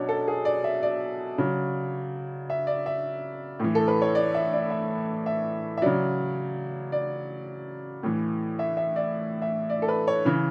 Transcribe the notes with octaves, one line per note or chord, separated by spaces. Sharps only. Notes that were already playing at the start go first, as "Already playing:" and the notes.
Already playing: B2 F#3 C#4 D4
A4
G#4
D5
E5
D5
C#3 F#3
E5
D5
E5
A2 E3
A4
B4
C#5
D5
E5
D5
E5
E5
E5
C#3 F#3 D5
D5
A2 E3
E5
E5
D5
E5
D5
A4
B4
C#5
C#3 E3